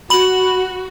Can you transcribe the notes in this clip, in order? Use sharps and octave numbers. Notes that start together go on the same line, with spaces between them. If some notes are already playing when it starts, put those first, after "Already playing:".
F#4 B5 F#7